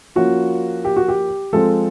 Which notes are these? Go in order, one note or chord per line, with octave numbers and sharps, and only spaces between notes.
F3 A#3 C#4 F4 F#4
G4
F#4
G4
F3 G#3 C4 A4